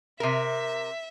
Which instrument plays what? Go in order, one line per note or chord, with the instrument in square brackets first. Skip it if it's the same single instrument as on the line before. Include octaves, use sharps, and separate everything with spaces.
[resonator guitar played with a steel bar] C3 A#4 [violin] E5